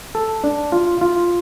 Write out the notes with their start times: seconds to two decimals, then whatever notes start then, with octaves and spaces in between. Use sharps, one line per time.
0.15 A4
0.44 D4
0.72 F4
1.01 F4